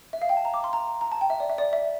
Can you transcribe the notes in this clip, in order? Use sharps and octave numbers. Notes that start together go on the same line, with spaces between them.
E5
F5
G5
A5
A#5
D6
C6
A#5
A#5
A5
G5
E5
D5
E5
D5
E5